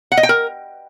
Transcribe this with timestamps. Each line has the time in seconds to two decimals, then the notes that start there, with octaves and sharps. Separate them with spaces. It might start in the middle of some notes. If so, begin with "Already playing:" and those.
0.12 F#5
0.17 D#5
0.23 G5
0.29 A#4